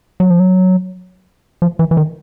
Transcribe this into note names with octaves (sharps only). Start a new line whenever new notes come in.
F#3
F3
F#3
F3
E3
E3
D#3